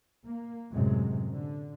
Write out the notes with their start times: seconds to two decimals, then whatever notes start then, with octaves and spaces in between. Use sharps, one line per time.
0.24 A#3
0.72 F#2 A2 C3 F#3 G#3
1.31 D3